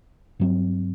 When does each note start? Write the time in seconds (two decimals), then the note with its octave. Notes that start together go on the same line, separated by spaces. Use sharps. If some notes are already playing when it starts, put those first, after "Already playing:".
0.39 G2 F#3 C4